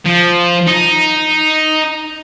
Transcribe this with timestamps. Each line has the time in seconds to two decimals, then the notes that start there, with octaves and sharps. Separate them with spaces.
0.06 F3
0.68 D#4